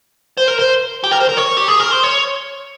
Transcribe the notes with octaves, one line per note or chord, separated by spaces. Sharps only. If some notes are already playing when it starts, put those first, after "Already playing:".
C5
A#4
C5
G4
A#4
C5
A#4
C#5
G4
G#4
A#4
C5
C#5